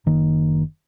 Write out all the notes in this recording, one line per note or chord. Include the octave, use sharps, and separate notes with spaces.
F#1 D#3 A#3